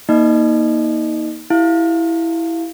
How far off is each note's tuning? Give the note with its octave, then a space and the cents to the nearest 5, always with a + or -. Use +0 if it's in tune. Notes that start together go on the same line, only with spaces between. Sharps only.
A#3 +20 D#4 +20 D#5 -35
E4 +0 G4 -15 F5 +0